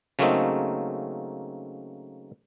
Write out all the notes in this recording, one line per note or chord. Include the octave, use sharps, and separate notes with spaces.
C#3 F#3 A3 A#3 C4 D#4